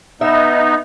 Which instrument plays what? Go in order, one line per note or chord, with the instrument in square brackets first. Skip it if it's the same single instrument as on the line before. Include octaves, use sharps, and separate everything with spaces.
[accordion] B3 D#4 [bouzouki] E5